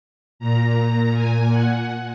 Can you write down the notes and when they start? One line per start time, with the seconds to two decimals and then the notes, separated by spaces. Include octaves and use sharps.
0.39 A#2 A#5
1.14 G#5
1.50 F#5